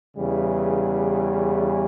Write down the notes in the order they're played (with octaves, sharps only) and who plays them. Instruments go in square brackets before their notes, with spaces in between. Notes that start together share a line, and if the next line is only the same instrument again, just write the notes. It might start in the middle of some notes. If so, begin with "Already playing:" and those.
[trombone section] E2 C#3 E3 G3